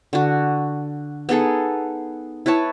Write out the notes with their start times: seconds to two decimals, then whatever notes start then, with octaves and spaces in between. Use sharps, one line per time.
0.13 D3 F#4
1.29 B3 D#4 G#4 A4
2.46 E4 B4 C#5 A5